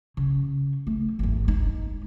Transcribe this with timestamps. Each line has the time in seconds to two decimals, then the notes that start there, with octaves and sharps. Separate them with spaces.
0.17 C#3
0.87 A3
1.19 G#1 E2
1.48 G#3 D#4